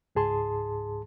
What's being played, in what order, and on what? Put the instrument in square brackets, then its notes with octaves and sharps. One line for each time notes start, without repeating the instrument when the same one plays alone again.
[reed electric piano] C#2 G#2 G#4 A5 C6